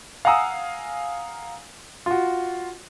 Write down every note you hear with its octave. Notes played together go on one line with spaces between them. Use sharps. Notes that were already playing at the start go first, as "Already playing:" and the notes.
F5 F#5 G#5 A#5 D#6 E6
F4 F#4